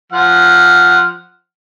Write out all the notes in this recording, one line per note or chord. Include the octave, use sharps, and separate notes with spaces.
F3 F#5 F6